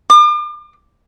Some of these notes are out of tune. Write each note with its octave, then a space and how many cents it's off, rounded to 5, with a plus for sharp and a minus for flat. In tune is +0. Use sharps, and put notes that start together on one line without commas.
D6 +40